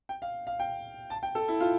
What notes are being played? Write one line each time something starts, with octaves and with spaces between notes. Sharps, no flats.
G5
F5
F5
G5
A5
G5
A4
E4
F4